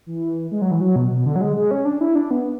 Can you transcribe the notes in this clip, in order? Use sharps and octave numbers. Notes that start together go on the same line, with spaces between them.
E3
G#3
F#3
E3
F#3
B2
B2
D3
F#3
G#3
G#3
C#4
D4
E4
D4
B3